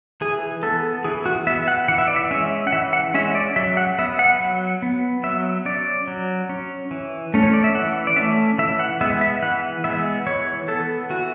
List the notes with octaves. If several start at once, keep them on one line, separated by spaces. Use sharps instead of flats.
E3 G#4
B3 A4
E3 G#4
F#4
B3 E5
F#5
E3 F#5
E5
D5
E5
G#3 C#4 E5
F#5
E3 E5
F#5
G#3 C#4 E5
D5
F#3 E5
F#5
B3 E5
F#5
F#3
B3
F#3 E5
C#4 D5
F#3
C#4
E3
A3 C#4
C#5
D5
E5
E3 F#5
D5
A3 C#4 E5
E3 E5
F#5
G#3 B3 E5
E5
E3 F#5
G#3 B3 E5
E3 C#5
B3 A4
E3 F#4